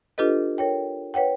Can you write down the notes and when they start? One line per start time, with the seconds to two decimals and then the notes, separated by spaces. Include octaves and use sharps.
0.18 D4 F4 G4 A4 B4 D#5
0.58 A#4 C#5 G5
1.14 B4 C#5 F#5 G5